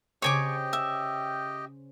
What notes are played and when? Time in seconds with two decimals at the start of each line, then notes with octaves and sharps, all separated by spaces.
0.22 C#3 G4 C5 C#5 D#5 G5 G#5 D6
0.73 E5